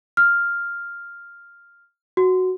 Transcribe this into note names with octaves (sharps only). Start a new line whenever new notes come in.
F6
F#4